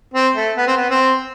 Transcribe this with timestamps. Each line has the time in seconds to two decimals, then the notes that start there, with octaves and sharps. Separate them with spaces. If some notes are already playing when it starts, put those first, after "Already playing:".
0.14 C4
0.36 A3
0.57 B3
0.68 C4
0.77 B3
0.90 C4